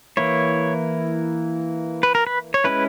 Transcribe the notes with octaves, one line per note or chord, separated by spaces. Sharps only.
E3 A#3 E4 C#5
B4
A#4
B4
C#5
G#3 C#4 E4 B4